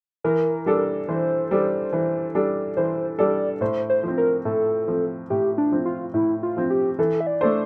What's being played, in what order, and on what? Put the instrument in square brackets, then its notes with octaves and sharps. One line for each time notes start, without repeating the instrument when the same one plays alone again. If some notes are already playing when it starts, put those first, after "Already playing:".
[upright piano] E3 [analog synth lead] A#4
[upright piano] G3 D4 A4
[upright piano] E3 [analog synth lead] C5
[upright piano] G3 D4 A4
E3
G3 D4 A4
[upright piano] E3 [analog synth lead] C5
[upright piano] G3 D4 A4 [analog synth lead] D5
[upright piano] A2 [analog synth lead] C5
[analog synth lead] C5
[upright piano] F3 C4
[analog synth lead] A#4
[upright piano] A2 [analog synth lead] A4
[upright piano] F3 C4
[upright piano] A2 [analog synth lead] G4
[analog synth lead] D4
[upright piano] F3 C4
[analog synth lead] F4
[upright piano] A2 [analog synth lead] E4
[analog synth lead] F4
[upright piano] F3 C4
[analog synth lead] G4
[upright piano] E3 [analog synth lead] A4
[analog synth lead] E5
D5
[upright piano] A3 D4 A4 C5